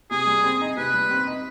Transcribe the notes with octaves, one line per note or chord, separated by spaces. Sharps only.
C3 G#4
G3
C4
D#4
C3 B4
G3
C4
D#4